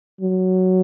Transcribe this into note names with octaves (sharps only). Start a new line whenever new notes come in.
F#3